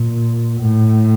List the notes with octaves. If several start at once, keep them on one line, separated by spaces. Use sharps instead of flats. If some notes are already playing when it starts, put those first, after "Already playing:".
Already playing: A#2
A2